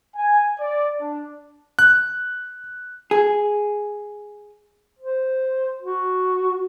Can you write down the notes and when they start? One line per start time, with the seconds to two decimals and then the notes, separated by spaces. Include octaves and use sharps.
0.16 G#5
0.60 D5
1.01 D4
1.79 F#6
3.11 G#4
4.99 C5
5.82 F#4